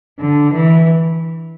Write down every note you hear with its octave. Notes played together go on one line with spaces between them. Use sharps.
D3
E3